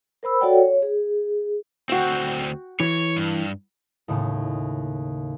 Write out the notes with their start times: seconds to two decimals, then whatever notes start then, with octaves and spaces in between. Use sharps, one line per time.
0.23 A#4 C5 B5 E6
0.41 F#4 A4 C#5 D5 F#5 G5
0.58 C#5
0.82 G#4
1.89 D2 C4 F#4 G5
2.80 E3 C#5
3.17 G2
4.08 D#2 A2 C#3